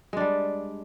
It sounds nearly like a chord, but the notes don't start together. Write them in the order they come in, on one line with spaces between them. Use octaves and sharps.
G#3 D4 G3